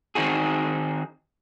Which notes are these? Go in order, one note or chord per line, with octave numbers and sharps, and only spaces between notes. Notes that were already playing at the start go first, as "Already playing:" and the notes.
D#3 C4 D#4 F#4 G#4